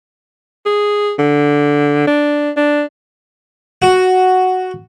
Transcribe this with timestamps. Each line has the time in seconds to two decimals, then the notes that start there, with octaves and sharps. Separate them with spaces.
0.66 G#4
1.19 D3
2.07 D4
2.57 D4
3.82 F#4